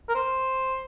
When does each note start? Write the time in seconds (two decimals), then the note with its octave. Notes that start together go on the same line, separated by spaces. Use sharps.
0.09 A#4
0.15 C5